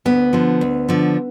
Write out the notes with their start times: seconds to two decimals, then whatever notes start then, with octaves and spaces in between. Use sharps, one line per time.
0.05 D2 B3
0.33 D3 F3
0.61 D2
0.89 D3 F3